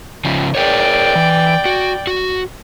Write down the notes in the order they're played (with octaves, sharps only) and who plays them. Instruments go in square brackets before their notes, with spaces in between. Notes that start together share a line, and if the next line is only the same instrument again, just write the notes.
[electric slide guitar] C#3 F3
[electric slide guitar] G#4 A#4 C#5 [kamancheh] D5 G5
[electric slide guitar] E3
F#4
F#4